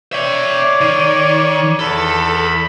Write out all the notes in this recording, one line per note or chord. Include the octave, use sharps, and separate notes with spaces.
C#5 D5 E5 G5
D#3
E2 A4 B5